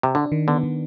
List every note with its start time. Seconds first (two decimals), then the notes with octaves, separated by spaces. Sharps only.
0.03 C3
0.15 D3 D4
0.32 D#3
0.48 D3 B3
0.63 D#3